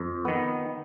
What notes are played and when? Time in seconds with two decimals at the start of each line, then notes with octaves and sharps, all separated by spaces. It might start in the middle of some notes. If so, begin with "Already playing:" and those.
Already playing: F2
0.25 D#3 B3